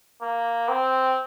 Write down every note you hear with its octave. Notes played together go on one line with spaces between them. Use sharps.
A#3
C4